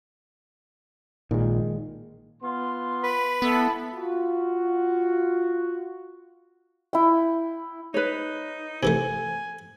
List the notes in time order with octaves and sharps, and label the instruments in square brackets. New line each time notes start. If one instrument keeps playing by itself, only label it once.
[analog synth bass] A#1 [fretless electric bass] D#3 G#3
[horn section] B3 F4 C6
[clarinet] B4 [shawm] B5
[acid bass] B3 [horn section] E4 A4
[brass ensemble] F4 F#4
[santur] E4 G5
[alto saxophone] D#4 [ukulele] B4 C#5
[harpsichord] C3 E3 A3 [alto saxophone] G#5